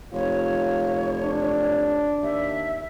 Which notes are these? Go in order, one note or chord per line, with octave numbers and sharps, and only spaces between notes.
F1 F4 C#5
D4
D#2 E5